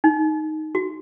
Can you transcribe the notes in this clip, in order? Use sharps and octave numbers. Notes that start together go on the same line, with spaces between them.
D#4
F#4